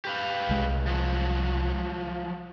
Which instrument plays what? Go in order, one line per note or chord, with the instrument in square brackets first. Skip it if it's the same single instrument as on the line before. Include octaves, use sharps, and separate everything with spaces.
[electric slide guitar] G4 B4 F5
[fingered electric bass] C2 G#3
[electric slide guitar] F3 F#3